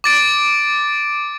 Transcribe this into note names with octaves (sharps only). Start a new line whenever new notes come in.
D6 A6 D7